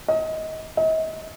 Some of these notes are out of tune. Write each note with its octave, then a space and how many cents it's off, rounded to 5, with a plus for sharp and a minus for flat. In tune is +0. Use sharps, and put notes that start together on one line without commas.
D#5 +25
D#5 +40